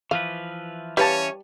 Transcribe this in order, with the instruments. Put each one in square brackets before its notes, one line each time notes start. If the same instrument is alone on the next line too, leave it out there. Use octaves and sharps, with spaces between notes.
[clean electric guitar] E3 F3 B4 [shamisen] F5
[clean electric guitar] E3 C#4 [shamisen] G3 [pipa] B4 F5 A5 [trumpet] C#5